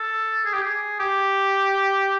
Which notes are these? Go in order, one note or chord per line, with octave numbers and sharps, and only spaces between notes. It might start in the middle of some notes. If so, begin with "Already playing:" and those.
Already playing: A4
G#4
G4
G#4
G4